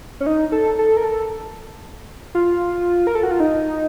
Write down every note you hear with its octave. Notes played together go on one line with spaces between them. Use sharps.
C#4
D#4
A4
A4
A#4
A4
F4
A#4
A4
F#4
F4
D#4